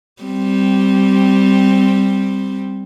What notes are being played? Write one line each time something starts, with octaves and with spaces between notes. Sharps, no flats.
G3 C4